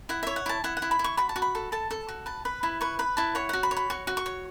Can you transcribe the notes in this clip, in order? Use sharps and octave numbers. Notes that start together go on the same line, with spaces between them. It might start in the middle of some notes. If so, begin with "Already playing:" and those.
E4 F#5
C#5 E5
F#5
E4 A5
E4 F#5
F#5
E4
B5
E4
C#6
F#4 B5
A5
F#4
B5
A4
A4 A5
A4
F#4
B4 A5
B4 B5
E4 B5
B4 C#6
B4 B5
E4 A5
C#5 F#5
F#4 F#5
B5
C#5
B5
F#4 C#6
F#4
C#6
C#5